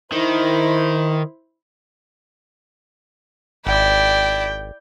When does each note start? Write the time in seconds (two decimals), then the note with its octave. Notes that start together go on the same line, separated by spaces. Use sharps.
0.12 D#3 E4 C5
3.67 G#1 E4 D5 G5